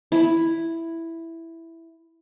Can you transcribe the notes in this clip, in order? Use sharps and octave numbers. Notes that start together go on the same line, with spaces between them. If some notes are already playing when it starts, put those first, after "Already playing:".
E4 B5